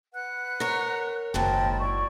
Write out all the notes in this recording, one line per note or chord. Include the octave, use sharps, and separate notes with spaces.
B4 F#5 F#6
A#4 C#5
F#1 D#2 G#2 F#3 A#4 G5 A5 B5
E4 D5 C#6